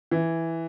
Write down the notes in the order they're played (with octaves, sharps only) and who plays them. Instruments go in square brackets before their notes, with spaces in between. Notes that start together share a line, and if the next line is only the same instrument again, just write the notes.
[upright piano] E3